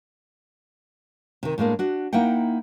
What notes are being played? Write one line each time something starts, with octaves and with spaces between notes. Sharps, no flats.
C3 D#3
A2 G#3 A#3 D4
D4 F#4
A#3 D#4 E4 F#5 G5